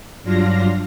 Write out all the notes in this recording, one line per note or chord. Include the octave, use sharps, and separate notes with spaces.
G2 F#3 D4 F4 F5 A#6